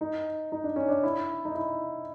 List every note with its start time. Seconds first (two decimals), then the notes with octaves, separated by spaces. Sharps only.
0.01 D#4
0.52 D#4
0.64 D4
0.76 C#4
0.88 D4
1.03 E4
1.45 D#4
1.55 E4